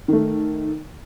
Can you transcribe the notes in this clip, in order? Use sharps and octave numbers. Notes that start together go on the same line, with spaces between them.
D#3 A3